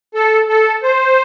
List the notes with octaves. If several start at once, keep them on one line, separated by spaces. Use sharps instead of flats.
A4
A4
C5